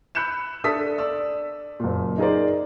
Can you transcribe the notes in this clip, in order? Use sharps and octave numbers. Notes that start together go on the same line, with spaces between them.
B5 F#6 G6 C#7 E7
D4 A4 E5 D#6 B6
D5 E6
F#1 A#2
D#4 G#4 A#4 C5 D5